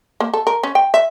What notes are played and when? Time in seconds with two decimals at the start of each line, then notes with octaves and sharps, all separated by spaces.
0.20 A#3
0.33 A4
0.47 A#4
0.63 C#4
0.75 G5
0.94 E5